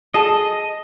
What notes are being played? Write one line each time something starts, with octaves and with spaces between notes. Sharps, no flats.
G#4 A4 D#5 A5